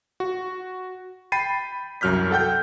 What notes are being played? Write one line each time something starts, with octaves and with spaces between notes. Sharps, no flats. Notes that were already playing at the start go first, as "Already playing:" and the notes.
F#4
G5 B5 A6 C7 D#7
C2 F#2 F#3 F6 G6 B6
A4 F#5 G5 G6